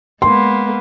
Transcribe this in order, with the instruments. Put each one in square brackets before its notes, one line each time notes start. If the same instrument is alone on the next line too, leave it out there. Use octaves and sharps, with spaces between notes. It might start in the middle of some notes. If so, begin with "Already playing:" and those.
[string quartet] G#3 A#3 B3 [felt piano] C6